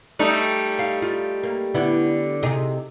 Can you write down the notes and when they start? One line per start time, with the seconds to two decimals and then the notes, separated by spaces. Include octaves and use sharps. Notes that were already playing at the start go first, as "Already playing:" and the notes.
0.19 G3 A3 D#4
0.79 F5
1.02 F4
1.43 A#3
1.74 D3 B3 E4
2.43 C3 D#4 G#4